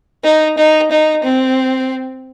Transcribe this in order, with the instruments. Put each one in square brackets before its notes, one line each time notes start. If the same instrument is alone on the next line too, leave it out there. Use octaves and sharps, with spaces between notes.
[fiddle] D#4
D#4
D#4
C4